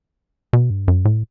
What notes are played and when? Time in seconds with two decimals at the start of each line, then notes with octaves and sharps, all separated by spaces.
0.53 B2
0.70 G2
0.88 F#2
1.05 A2